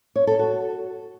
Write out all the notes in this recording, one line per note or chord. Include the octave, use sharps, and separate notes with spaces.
C#5
A4
F#4